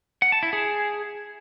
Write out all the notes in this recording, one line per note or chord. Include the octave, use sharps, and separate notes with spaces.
F#5
A5
E4
G#4